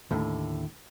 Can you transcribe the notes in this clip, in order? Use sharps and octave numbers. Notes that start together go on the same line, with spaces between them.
D#2 A2 D3